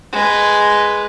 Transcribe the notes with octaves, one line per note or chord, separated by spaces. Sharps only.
G#3 B4